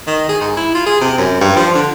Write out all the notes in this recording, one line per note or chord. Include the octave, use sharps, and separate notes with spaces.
D#3
G#4
G#2
E4
F4
G#4
C3
F#2
G2
F3
D3